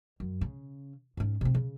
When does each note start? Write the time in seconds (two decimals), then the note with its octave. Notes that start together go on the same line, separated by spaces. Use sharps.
0.20 F#2
0.41 C#3
1.17 G#2 C#4
1.41 C3 C4
1.54 C#3